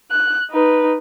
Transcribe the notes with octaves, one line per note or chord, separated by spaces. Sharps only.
F#6
D#4 B4